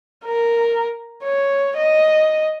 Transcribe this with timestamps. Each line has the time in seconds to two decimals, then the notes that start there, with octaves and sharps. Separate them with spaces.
0.25 A#4
1.23 C#5
1.77 D#5